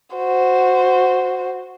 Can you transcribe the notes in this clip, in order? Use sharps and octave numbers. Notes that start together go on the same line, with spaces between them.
F#4 C5